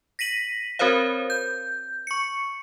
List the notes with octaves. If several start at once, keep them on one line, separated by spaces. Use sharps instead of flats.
A#6 B6 D#7 F#7
C4 F#4 A#4 C5 C#5 F5
G6
C#6 C#7